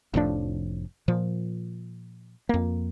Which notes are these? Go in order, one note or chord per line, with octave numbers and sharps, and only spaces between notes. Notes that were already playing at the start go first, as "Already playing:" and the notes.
F1 A2 F3 D4
A#2 F3
F2 A#3